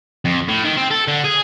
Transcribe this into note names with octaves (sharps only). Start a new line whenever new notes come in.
F2
A2
D#3
C4
A4
D3
G#4